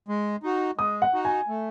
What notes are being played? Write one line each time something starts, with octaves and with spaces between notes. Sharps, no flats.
G#3
D#4 F#4
G#3 D#6
F#5
D#4 F#4
G#5
A3